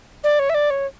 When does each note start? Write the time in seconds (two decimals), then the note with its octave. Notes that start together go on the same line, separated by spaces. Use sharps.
0.24 D5
0.39 C#5
0.50 E5
0.54 D5
0.70 C#5